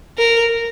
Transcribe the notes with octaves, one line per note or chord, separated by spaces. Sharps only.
A#4